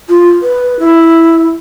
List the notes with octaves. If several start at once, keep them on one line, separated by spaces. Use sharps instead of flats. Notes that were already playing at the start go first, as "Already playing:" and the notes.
F4
B4
E4